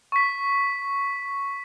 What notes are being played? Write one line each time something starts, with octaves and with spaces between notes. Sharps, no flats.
C#6 B6